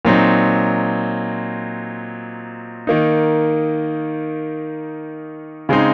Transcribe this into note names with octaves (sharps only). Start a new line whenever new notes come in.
A#2 F#3 C4 D#4
D#3 A#3 D#4
C#3 G#3 C4 D#4